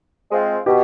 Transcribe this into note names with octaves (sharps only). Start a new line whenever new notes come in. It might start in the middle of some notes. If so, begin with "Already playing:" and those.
G#3 C4 F4
B2 G4